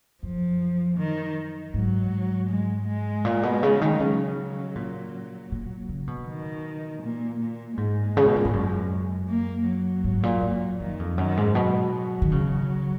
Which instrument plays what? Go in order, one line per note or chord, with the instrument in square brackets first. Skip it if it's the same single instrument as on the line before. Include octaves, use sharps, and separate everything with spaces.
[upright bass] F#2 [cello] F3
[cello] D#3
[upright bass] G#2 [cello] F#3
[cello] G#3
G#3
[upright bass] A#2
B2
C#3
D#3
[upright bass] C#3 [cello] F#3
[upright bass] A#2
A#2
C#3
B2
[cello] D#3
A#2
A#2
[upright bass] G#2 [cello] G#3
[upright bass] C#3
B2
A#2
G#2
F#2
[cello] A#3
F#3
[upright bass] G#2
A#2
F#2
[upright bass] F#2 [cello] D#3
[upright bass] F2
[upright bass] F#2 [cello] D#3
[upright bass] G#2
[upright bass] B2 [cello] F#3
[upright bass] D#3
C#3